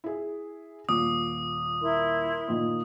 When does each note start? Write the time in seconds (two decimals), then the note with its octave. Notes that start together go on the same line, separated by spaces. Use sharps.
0.04 E4 G#4
0.89 D#1 A#2 D6 D#6
1.81 E4 A#4 C6
2.48 A#2 D#3